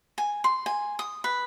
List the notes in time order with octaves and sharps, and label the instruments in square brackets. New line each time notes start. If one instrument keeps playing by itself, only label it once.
[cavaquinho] G#5
C6
G#5
D#6
B4